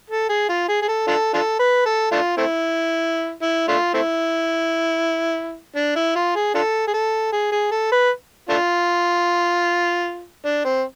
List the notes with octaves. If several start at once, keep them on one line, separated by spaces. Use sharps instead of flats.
A4
G#4
F4
G#4
G#4
A4
D4 F4 A4
D4 F4 A4
B4
A4
A3 D4 F4
A3 C4 E4
E4
A3 D4 F4
A3 C4 E4
D4
E4
F4
G#4
D4 F4 A4
G#4
A4
G#4
G#4
A4
B4
A3 D4 F4
D4
C4